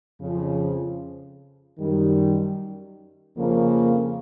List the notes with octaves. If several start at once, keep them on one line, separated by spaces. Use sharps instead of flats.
F2 C#3 F3
F#2 D#3 G3
F2 C#3 F3 A#3